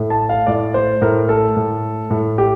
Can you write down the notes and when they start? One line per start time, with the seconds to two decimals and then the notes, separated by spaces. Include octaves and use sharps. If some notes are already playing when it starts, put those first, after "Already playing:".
Already playing: A2
0.10 A5
0.29 F5
0.47 A2 D5
0.74 C5
1.02 A2 A#4
1.29 A4
1.57 A2
2.10 A2
2.38 G4